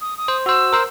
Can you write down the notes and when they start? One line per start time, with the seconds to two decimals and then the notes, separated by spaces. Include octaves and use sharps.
0.01 D#6
0.17 D#6
0.28 C5
0.46 F#4 C5 E6
0.73 A#4 C5